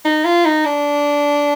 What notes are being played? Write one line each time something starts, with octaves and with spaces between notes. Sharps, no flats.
D#4
F4
D#4
D4